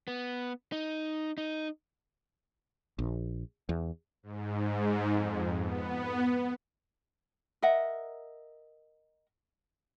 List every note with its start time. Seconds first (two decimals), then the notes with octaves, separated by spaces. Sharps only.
0.08 B3
0.72 D#4
1.38 D#4
2.99 A#1
3.69 E2
4.23 G#2
5.11 F2
5.60 B3
7.62 A#4 D#5 E5 F#5